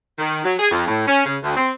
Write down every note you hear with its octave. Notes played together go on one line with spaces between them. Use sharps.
D#3
F#3
G#4
F2
A2
C#4
C#3
D2
C4